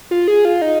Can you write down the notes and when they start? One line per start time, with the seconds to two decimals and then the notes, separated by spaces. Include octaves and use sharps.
0.11 F4
0.28 G#4
0.45 F4
0.62 D#4